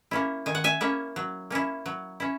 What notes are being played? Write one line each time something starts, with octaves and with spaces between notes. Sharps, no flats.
A#3 C#4 E4
D#3 G#5
F#5
E5 G#5
A#3 C#4 E4
F#3
A#3 C#4 E4
F#3
C#4 E4